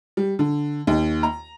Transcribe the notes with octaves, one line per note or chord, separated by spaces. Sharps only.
G3
D3
D#2
A#5